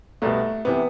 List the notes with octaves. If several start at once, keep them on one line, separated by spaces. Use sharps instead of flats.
C2 B2 A3
C3 E3 B3